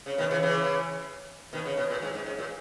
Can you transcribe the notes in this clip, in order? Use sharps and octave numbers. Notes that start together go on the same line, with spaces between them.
C#3
B2 D#3
C#3 E3
C#3 E3
B2 D#3
C#3
B2
A#2
G#2
G#2
G#2
A#2